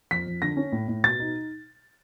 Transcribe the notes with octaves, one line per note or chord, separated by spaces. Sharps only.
F2 B6
F2
D3 A#6
C#4
A2
A2
B2 A6
D#4